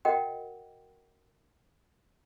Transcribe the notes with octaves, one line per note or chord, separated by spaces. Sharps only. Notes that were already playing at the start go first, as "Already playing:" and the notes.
F#4 A#4 D#5 F#5 G5